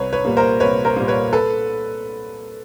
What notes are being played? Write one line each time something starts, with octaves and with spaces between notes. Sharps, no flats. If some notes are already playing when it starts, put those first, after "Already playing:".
Already playing: C2 B4 C#5
B4 C#5
A#2 G3 A#3
A#4 C5
C2 B4 C#5
A#4 C5
A#2 G3 A#3
B4 C#5
A4 B4